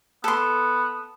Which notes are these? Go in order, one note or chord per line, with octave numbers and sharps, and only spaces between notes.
B3 A4 C6